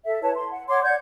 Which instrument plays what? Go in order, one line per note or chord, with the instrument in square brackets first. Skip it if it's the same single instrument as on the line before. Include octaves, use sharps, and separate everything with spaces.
[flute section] A4 E5
E4 B4 C#5 A5
C6
F#5
C#5 F#5 C6 D6
D5 F#5 G6 G#6